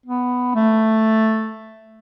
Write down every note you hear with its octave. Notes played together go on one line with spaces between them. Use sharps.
B3
A3